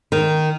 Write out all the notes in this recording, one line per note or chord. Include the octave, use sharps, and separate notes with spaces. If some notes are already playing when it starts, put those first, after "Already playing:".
D#3